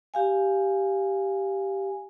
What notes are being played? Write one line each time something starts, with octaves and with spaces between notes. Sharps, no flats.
G4 F5 G#5